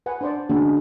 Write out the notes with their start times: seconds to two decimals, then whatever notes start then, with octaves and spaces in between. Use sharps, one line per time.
0.06 B4 F#5 G#5
0.21 D4 C5 D5
0.49 D3 G#3 C#4 F#4